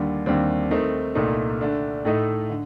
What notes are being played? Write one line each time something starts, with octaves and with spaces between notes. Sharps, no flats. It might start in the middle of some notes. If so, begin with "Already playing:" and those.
Already playing: D#2 D3 G3
D#2 D3 G3 C4
D#3 A3 C4 D#4
C2 A#2 A3 D#4
D3 A3 D4
A2 A3 D#4 A4 D#5
D3